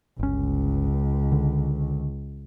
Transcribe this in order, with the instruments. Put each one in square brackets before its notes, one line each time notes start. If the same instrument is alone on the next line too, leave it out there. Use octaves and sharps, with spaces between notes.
[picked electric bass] G1 C#4 [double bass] C#2
[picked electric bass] D3